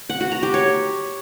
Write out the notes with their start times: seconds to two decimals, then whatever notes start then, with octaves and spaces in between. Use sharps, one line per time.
0.10 F#5
0.21 F#4
0.32 A#5
0.43 G4
0.54 C#5